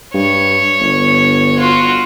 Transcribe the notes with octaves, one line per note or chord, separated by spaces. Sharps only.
G2 C#5
G1
F4 F#4